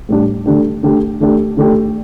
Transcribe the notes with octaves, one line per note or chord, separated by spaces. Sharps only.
A2 G3 D4
D3 A3 D4 G4
D3 A3 D4 G4
D3 A3 D4 G4
D3 A3 D4 G4